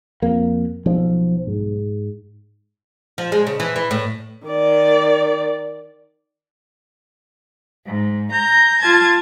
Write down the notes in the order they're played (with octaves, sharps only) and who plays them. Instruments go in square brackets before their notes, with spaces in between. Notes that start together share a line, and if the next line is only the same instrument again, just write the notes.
[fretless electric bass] F2 A#3
[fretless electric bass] B1 [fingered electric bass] F3
[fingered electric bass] G#2
[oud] F3
G#3
C#3
E3
E3
A2
[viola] D#3 D5
[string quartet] G#2
A#5 G6
F4 A5 G#6